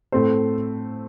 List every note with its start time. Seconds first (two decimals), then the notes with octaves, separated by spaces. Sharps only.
0.12 A2 A3 C4 A4 C5